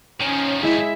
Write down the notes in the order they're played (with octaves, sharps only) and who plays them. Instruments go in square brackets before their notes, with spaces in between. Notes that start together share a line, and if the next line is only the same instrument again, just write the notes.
[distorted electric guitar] D#3 F3 [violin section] C#4
[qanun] G#3 E4 [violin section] E5